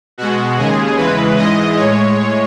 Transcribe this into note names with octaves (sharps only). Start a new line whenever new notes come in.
B2 G#3 F#4
D#2 C#3 G#3 G#4
E2 C#3 E3 G#3 B4
G#2 E3 G#3 D#5
A2 G#3 C#5